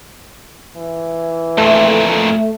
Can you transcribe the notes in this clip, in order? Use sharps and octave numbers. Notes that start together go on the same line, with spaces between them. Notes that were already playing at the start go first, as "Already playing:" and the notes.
E3
F2 A#2 A3